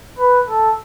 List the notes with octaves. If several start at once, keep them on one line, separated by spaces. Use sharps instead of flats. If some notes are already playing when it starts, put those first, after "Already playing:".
B4
A4